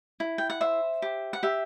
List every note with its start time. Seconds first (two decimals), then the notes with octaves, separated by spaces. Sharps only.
0.20 E4
0.38 G5
0.50 F#5
0.61 C5 E5
1.02 G4
1.33 F#5
1.43 G4 E5